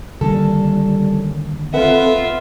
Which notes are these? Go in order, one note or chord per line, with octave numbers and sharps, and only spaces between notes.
D3 D#3 G3 A#3 C#4 A4
C4 F4 A4 B4 E5 F#5